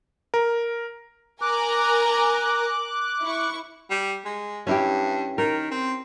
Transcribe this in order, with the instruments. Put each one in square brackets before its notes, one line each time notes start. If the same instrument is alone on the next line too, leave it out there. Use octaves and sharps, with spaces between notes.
[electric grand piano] A#4
[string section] A#4 G#5 A#5 [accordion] D6 F#6
[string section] E4 C#6
[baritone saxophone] G3
G#3
[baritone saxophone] G2 [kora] C#4 E4 G4
[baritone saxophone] D#3 [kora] A#4
[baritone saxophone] C4